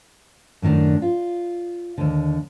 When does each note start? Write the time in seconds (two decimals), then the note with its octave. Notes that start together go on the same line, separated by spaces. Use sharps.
0.62 F#2 A2 D#3 D4
1.02 F4
1.98 D#2 D3